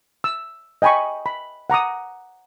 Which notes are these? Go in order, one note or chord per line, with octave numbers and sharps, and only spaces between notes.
E6
D#5 G5 G#5 B5 C#6
B5
F#5 A#5 D6 D#6